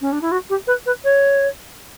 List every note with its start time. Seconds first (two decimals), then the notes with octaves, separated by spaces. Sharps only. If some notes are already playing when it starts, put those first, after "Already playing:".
0.01 C#4
0.12 D4
0.21 E4
0.31 F#4
0.49 G4
0.67 B4
0.86 B4
1.04 C#5